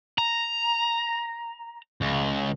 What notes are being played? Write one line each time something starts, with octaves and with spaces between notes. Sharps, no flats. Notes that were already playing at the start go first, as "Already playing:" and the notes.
A#5
C#2